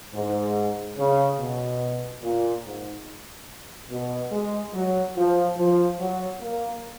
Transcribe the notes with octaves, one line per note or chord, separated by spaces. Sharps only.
G#2
C#3
B2
A#2
G#2
B2
G#3
F#3
F3
F3
F#3
A#3